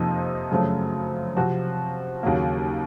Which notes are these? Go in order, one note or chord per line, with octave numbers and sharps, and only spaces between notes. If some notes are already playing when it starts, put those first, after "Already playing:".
Already playing: F2 C3 F3 A#3 D#4
F#2 C#3 F3 A3
C3 F3 C4 F#4
D#2 C#3 F#3 A#3